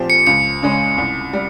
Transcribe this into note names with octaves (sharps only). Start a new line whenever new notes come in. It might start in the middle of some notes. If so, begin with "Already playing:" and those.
Already playing: A#2 F3 C4 G4 C5
C#7
C#2 C#7
C#3 G#3 C#4
C2
G3